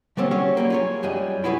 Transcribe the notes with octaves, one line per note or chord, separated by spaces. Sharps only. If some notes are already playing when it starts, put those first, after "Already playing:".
D3 G3 A#3 C4 C#4
G3 C#4 F#4 G#4 C#5
F#3 G3 A#3
F4 G#4 C#5
F#2 G3 G#3 G#4
E4 F#4 G#4 B4 C#5